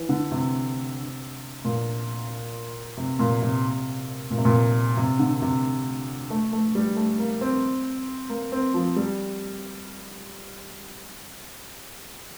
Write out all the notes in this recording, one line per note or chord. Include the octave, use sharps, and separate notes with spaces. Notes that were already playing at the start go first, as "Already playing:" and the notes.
Already playing: E3
D3
C3
A#2
C3
A#2
C3
A#2
C3
A#2
C3
D3
C3
A3
A3
G3
A3
A#3
C4
A#3
C4
F3
G3